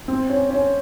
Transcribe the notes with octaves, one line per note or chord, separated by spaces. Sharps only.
C4
C#4
C#4